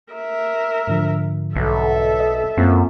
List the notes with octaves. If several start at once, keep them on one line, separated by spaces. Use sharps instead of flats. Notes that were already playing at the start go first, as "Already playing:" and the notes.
A#4 E5
G#2 D3 F3
B1 A4 E5
D#5
F#2 A#3 C4 F4